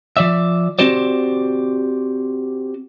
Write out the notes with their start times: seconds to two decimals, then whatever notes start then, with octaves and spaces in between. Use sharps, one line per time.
0.17 F3 D5 E5
0.79 C4 F#4 G4 C5 D5